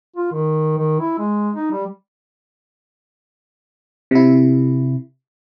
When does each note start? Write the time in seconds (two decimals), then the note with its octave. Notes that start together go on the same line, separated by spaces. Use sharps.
0.16 F4
0.32 D#3
0.78 D#3
1.00 E4
1.18 G#3
1.56 D#4
1.71 G3
4.11 C3 E4